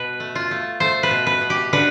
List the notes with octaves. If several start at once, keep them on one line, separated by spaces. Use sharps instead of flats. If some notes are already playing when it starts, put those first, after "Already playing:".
Already playing: B2 B4
A3
F4
A3
A3 C5
B4
B2
B4
B2
G4
D3 B4